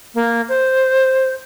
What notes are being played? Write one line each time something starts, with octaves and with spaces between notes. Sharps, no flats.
A#3
C5